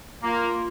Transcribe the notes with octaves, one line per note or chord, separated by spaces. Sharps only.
A#3 F4